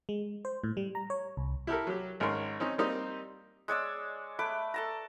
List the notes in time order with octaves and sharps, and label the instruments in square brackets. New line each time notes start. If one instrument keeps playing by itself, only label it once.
[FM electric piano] G#3
C5
A2
G3
A#5
C#5
C2
[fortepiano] E4 G4 A4 A#4
F#3 G4
G#1 G#3 C#4 A#4 C6
C4 C#4 D#4
G3 A#3 C4 D#4 G4 D#5
[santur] G#3 C#5 D5 E6
A3 B4 D6
A4 A5 A#5